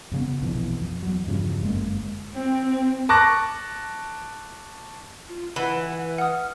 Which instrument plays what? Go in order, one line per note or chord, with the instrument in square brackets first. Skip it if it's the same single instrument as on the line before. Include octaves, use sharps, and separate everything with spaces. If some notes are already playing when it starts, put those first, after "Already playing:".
[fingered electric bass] F2 C#3 B3
A#1 F2 B2 E3
F2
E2 F#3
E2 G2 C#3 F3
G1 F#2 G#3 A#3
[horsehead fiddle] C4
[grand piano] A5 C#6 D6 F#6 A#6
[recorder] F4
[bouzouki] E3 [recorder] B4 [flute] F#5 [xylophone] B5
[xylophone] F#5 D#6 [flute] F6